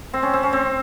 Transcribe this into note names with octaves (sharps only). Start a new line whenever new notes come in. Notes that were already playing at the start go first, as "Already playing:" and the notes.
C4
C#4
C4
C#4
C4